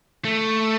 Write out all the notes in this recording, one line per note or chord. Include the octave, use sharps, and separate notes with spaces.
A3